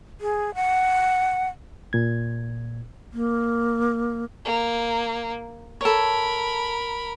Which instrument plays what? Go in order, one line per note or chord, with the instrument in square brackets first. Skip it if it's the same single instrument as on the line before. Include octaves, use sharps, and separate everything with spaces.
[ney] G#4
F#5
[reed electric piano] A#2 G#6
[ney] A#3
[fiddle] A#3
[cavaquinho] A4 C#5 [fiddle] A#4 B5